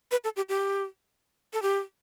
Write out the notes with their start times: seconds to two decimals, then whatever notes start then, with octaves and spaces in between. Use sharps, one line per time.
0.11 B4
0.24 A4
0.36 G4
0.49 G4
1.53 A4
1.62 G4